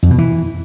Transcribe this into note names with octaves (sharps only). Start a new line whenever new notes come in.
F2
B2
E3